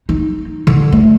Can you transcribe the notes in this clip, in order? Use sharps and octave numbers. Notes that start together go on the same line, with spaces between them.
D#4
D3
A3